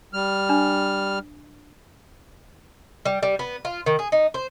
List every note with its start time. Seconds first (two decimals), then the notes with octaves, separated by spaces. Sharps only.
0.13 G3 F6
0.49 D4
3.05 G3
3.23 G3
3.39 B3
3.65 F4
3.86 D#3
3.99 G#4
4.12 D#4
4.34 C5